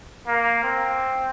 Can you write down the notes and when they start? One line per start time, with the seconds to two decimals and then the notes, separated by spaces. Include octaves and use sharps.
0.27 A#3
0.64 C4